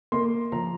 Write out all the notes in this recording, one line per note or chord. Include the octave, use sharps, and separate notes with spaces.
A#3 C6
F3 A#5